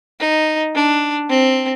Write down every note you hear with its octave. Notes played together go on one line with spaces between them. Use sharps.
D#4
D4
C4